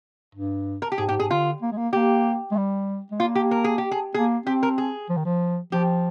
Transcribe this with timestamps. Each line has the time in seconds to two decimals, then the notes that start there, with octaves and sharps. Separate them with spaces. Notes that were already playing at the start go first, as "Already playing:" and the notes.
0.35 G2
0.82 A#4
0.92 G4
0.98 G#2 G#4
1.09 G#2 G4
1.19 G#2 G#4
1.30 D3 F4
1.62 A#3
1.72 G#3
1.77 A#3
1.93 A#3 G4
2.51 G#3
2.57 G3
3.11 G#3
3.20 A#3 F4
3.35 G4
3.51 A#4
3.64 G#4
3.78 G4
3.91 G#4
4.14 A#3 G#4
4.46 C4 G4
4.63 A#4
4.78 G#4
5.09 F3
5.17 D#3
5.25 F3
5.72 F3 G4